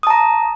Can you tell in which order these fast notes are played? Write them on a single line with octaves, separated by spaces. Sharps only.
D#6 A5 A#5